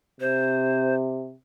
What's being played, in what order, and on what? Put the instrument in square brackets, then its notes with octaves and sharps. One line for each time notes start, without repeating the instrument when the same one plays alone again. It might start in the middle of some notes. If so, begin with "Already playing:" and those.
[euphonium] C3 [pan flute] C5